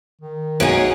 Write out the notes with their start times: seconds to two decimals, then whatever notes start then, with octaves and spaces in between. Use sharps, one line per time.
0.21 D#3
0.60 B1 C#4 D#4 F#4 G#4 D7 F#7